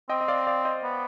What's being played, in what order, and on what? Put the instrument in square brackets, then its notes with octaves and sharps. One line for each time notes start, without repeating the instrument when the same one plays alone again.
[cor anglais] C4 [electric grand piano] D#5 G5
[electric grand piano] D#5
D5 F5
D5 F5
C5 D#5
[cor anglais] B3